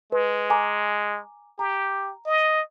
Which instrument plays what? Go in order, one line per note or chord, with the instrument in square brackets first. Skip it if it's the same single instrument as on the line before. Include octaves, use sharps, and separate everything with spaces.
[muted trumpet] G#3 [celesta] B4
[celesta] G#5 A#5 D6
[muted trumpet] G4 [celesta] A#5
[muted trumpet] D#5